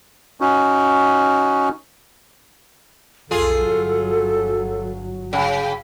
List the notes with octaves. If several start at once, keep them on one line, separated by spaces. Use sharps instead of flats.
C#4 D#4 F#4
B1 F2 F4 G#4 A4
G1 F#3
C#3 G5